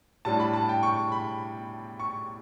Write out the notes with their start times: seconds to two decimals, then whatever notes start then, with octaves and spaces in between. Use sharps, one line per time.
0.25 A2 G3 D4 A5
0.40 B5
0.53 A5
0.69 G5
0.83 C#6
1.12 B5
2.00 C#6